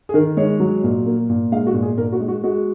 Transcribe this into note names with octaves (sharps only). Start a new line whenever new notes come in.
G#4
D#3 A#4
G#3 C#5
F#3
A#2
A#3
A#2
G#3 F5
F#4
A#2
G#4
A#2 A#4
F#4
G#3
F#4
G#3 F#4